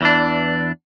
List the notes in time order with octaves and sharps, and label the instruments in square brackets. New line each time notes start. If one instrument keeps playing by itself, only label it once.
[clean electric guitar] E2 E3 D4